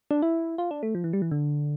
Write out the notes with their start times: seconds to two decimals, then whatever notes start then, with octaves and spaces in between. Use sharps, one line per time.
0.11 D4
0.22 E4
0.58 F4
0.71 D4
0.83 A3
0.95 F3
1.04 E3
1.13 G3
1.22 E3
1.31 D3